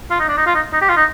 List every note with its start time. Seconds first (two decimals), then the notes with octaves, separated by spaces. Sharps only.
0.11 F4
0.20 D#4
0.29 D4
0.37 D#4
0.46 F4
0.55 D#4
0.73 D#4
0.81 G4
0.89 F4
0.97 D#4